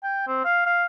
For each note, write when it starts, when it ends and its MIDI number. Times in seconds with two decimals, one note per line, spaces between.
0.03 0.24 79
0.27 0.41 60
0.45 0.66 77
0.66 0.85 77